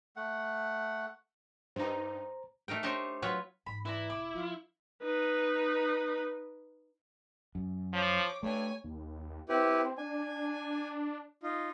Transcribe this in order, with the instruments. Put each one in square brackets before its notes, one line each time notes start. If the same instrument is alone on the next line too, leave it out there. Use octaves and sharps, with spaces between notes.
[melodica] A3 F#5
[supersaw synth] G2 D#4 [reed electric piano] C5 A#5
[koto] A3 D#4 A#4 G5
D4 D#4 G4 C5 C#5 D#5
F#3 F4 B4 C#5
[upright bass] G#2 E3 [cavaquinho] B5
[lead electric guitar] E4 [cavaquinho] B4 D5 A#5
[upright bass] E1 [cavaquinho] D6
[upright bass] F3 [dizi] F4
[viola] D#4 B4
[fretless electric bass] F#2
[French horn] F3 [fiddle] C#5 D6
[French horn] G2 [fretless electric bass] A3 [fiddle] C#5 G#5
[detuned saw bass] D#2
[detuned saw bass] C4 [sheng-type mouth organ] E4 G4 B4
[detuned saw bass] D4 [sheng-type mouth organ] G#5
[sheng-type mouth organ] D#4 F4